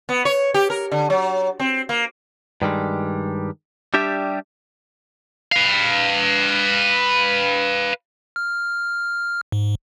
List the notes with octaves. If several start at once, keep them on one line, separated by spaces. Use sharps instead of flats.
B3
C#5
G4
A#4
D3
F#3
C4
A#3
G2 D#3 G3 G#3
G3 D4 G4 E5
B4 F5
F6
G#2